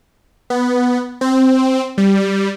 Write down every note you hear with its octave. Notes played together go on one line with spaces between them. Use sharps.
B3
C4
G3